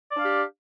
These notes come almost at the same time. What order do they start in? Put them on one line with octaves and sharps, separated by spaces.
D5 D4 F5 G4